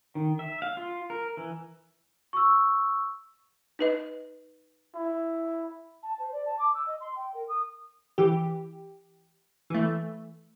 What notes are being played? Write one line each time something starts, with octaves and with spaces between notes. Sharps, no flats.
D#3
E5
F5
F4
A#4
E3
C#6 E6
D#4 B4 D#5
E4
A5
C5
D5
A5
D6
E6
D#5
C6
G5
A#4
D#6
E3 G4
E3 A3